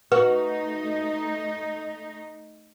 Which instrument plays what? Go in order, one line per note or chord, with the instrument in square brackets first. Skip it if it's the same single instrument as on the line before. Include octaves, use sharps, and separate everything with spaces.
[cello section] A3 D#4 [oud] F#4 [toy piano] B4